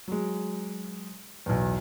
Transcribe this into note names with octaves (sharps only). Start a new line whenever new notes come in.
F#3 G#3
B1 E2